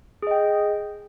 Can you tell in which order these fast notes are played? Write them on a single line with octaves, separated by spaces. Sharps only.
G#4 D#5 G5